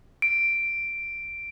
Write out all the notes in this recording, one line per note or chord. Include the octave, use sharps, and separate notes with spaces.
D7